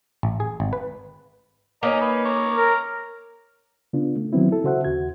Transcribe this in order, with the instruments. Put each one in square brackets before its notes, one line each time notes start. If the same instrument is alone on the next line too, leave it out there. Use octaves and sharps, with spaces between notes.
[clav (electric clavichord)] A1
G#4
G#1
B4
[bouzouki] A#3 C#4 D#4 [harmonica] D#5 A#5
[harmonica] B4
C#5 A#5 D6
[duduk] A#4
[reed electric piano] C#3 B3 D4 F4
A3
D#3 F#3 B3 C4 E4
E4 A4
C#3 F#4 C5 E5 F#5
D#2 F#4 G#6